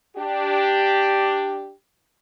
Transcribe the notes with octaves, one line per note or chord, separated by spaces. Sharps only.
D4 G4